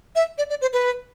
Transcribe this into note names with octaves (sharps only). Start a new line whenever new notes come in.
E5
D5
D5
C5
B4